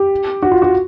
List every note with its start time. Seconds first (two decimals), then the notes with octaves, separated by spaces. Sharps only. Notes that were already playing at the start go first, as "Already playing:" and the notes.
Already playing: G4
0.42 F#4
0.51 F4
0.62 F#4